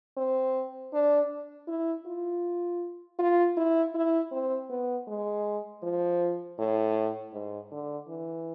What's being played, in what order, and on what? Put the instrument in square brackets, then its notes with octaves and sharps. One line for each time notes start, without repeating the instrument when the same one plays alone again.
[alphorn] C4
D4
E4
F4
F4
E4
E4
C4
B3
G#3
F3
A2
G#2
D3
E3